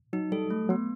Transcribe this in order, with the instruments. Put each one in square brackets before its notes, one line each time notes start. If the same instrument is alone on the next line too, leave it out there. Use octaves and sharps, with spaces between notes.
[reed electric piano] F#3 [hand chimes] D#4
[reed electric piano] G3 [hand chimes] A4
[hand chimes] A3
[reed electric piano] F#3 [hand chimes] B3